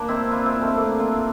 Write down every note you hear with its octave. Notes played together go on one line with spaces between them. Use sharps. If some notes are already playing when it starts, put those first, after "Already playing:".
Already playing: A#3 D4
C4 E4
D4 F4
C4 E4
A3 C4
A#3 D4
D4 F4